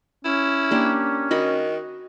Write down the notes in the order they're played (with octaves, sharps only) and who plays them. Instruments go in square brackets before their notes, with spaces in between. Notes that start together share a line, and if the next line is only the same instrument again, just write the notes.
[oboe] C#4 [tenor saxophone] E4
[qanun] A#3 D4 G4
[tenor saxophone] D#3 [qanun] F#4 D#5 B5